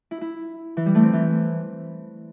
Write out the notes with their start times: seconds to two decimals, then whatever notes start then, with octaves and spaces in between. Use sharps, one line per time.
0.11 E4
0.21 E4
0.77 E3
0.86 G3
0.95 A3
1.03 C4
1.13 E3